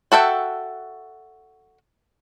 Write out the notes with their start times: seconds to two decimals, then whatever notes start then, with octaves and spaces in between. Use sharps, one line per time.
0.12 F#4 A4 E5 G5